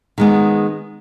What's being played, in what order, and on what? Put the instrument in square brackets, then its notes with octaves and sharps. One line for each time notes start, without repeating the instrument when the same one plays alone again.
[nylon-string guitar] D#3 G#3 B3